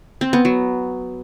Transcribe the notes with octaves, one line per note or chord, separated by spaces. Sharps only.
C4
B3
F#3